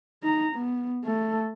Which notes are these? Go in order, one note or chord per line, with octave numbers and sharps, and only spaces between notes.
D#4 A#5
B3
A3 A4